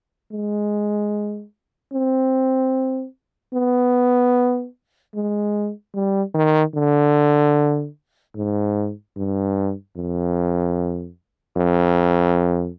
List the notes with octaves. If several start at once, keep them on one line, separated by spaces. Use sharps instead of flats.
G#3
C4
B3
G#3
G3
D#3
D3
G#2
G2
F2
F2